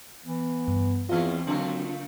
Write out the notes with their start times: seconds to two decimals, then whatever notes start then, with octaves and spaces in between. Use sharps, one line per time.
0.25 E3 B3
0.68 G2
1.09 E2 E3 A3 C4 F4 D#5 F5
1.47 C#3 F#3 A3 A#3